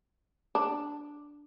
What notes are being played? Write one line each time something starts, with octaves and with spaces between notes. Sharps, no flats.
D4